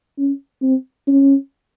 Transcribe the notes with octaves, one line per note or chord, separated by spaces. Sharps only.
C#4
C4
C#4